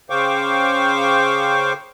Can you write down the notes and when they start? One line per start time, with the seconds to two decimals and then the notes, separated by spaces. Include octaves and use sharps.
0.10 C#3 C5 F5 G5 C#6 D6